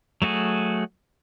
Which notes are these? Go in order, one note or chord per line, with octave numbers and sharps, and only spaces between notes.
F#3 A3 F#4 G#4